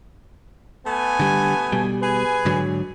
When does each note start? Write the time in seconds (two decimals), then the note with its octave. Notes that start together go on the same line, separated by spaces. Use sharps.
0.87 A3 B3 G#5
1.20 D3 G3
1.72 B2 G3
2.02 G#4 B4 G#5
2.45 G#2 D3 F#3